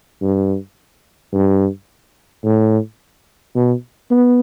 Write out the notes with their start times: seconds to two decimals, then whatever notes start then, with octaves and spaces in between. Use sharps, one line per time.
0.22 G2
1.33 G2
2.44 A2
3.55 B2
4.11 B3